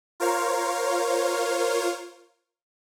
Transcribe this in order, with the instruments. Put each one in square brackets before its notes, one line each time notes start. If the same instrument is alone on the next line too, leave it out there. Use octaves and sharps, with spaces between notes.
[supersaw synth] F4 A#4 C5 C#5 F5